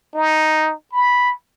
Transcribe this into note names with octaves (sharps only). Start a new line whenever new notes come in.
D#4
B5